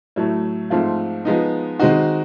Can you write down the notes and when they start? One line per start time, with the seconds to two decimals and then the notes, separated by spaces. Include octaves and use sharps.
0.16 A2 F#3 A3
0.70 G#2 F3 A3 C4 F4
1.25 F3 G#3 B3 D#4
1.79 D#3 G#3 C4 D#4 F#4